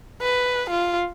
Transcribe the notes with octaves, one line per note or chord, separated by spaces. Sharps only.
B4
F4